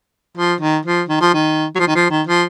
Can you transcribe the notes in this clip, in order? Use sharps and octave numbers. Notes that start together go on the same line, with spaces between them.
F3
D#3
F3
D#3
F3
D#3
F#3
F3
D#3
F3
D#3
F3